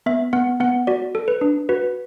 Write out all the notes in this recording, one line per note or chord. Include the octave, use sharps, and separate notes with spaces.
B3 E5
B3 F#5
B3 F#5
F#4 D5
A4
B4
D4
F#4 B4